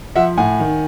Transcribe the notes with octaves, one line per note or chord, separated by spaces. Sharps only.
F3 E5 F#5
A2 F#5 G#5
D#3